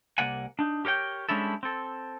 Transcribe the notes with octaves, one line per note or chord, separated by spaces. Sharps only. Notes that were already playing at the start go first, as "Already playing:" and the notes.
C2 C3 A#3 D5 F#5 G#5
D4 D#4
G4 A#4 C#5 G5
G3 G#3 C#4 D4 E4 A4
C4 A4